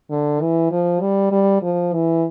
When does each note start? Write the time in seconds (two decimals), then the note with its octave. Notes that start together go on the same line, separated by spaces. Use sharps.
0.10 D3
0.42 E3
0.71 F3
1.01 G3
1.32 G3
1.62 F3
1.93 E3